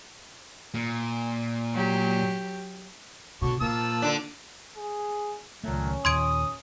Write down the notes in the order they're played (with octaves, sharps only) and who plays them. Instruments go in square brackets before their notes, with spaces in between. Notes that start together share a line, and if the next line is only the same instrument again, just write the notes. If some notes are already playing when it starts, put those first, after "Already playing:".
[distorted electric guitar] A#2
[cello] F#3 G4
[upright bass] B2 [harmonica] D3 C#5 D6 [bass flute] F#4
[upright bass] A#2 [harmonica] F3 A5 E6 [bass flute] A#3
[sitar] D3 D4
[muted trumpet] G#4
[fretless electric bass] C#2 A3 [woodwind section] A#2 D#3 F#3 [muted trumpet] C#4
[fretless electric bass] D#2 A#2 [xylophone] C6 G#6 D7 [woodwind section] D#6